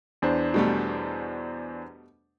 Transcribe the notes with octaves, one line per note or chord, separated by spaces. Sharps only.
E2 D4 C5
B2 G3 A3